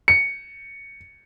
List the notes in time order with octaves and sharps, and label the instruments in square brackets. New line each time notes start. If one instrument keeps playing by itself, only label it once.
[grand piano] C#7